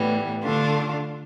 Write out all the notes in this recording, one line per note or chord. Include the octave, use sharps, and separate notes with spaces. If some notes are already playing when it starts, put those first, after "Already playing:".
Already playing: A2 E3 G3 B3
D3 A3 D4 F4